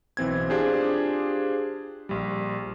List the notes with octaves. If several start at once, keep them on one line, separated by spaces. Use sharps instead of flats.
B1 E3 C4 G#6
D4 F4 G4 G#4 C5
A#1 G3